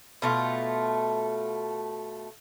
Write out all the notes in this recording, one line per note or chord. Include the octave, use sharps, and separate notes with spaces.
B2 A3 F4